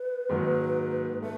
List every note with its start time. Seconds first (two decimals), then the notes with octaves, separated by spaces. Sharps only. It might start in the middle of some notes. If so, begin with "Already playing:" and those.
Already playing: B4
0.29 G#2 D#3 F#3 A#3
1.22 A3 B4